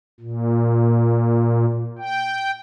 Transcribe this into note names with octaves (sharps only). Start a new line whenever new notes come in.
A#2
G5